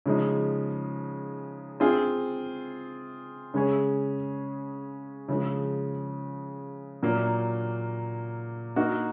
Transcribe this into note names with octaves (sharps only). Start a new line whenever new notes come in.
C#3 F3 G#3 D#4
C4 F4 G#4
C#3 G#3 C#4 G#4 C#5
C#3 F3 G#3
A#2 F#3 A#3
A#3 D#4 F#4